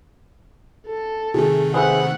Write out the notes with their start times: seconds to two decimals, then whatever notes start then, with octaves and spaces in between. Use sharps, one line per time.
0.87 A4
1.34 C3 D#3 A3 G#4
1.74 G#4 B4 C5 E5 F#5